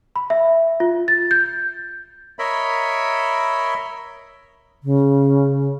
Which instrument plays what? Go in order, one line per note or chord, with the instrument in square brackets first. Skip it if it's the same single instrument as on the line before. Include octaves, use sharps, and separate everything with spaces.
[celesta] B5
E5
F4
A6
G6
[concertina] A#4 C#5 D#5 E5 B5
[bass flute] C#3